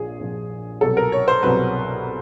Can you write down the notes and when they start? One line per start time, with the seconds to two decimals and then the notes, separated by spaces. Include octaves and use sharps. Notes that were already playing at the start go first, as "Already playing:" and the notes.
Already playing: A#1 A#2 F3 G#4
0.20 A#1 A#2 F3
0.81 C2 B2 F#3 A4
0.97 A#4
1.12 C#5
1.28 C5
1.42 C2 B2 F#3 B4